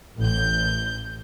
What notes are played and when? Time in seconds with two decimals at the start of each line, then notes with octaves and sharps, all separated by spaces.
0.19 A1 G6